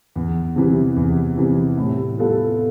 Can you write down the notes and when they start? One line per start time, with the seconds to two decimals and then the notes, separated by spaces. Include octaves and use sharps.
0.16 E2
0.56 C3 E3 G3
0.96 E2
1.37 C3 E3 G3
1.77 A2
2.18 G3 B3 F4 A4